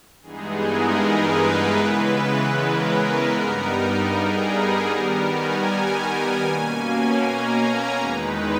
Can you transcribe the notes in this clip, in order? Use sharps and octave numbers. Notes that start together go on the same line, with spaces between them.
G2 E3 G#3 B3 D#4 G#4
A#4
B4
C#3 E3 G#3 B3
A#4
G2 G3 B3 D#4
G#4
D#3 G3 B3 A#4
G#5
B2 A#3 C#4
A#5
E2 D#3 G#3 D#4 B4